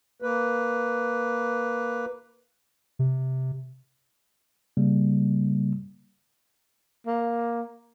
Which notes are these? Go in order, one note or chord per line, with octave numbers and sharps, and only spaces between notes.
A#3 B4
C3
C#3 G3 A#3
A#3